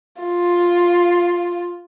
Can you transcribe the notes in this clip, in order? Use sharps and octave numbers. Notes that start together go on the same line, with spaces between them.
F4